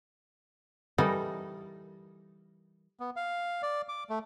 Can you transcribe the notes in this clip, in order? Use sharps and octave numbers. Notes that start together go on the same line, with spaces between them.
E3 G3 D#4 A4 A#4
B3
F5
D5
D6
A3